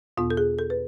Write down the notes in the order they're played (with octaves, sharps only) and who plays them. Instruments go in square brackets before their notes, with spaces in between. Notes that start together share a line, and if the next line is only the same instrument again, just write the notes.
[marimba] E2 B2 B3 F4
A4
G#4
A4
B4